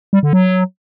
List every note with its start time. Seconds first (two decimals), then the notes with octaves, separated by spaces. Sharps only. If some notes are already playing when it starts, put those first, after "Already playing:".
0.13 G3
0.23 D3
0.33 F#3